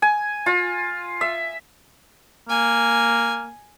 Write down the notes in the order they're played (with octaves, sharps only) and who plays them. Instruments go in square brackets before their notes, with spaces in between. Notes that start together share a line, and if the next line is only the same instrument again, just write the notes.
[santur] G#5
F4
E5
[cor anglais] A#3 [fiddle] G#5